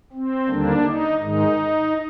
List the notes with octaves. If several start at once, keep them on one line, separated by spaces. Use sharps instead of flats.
C4
D#2 D3 G3 A#3 D4
D#4
G#2 D#3 G#3 D#4